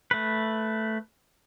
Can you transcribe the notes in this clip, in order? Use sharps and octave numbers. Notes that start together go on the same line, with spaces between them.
A3 B4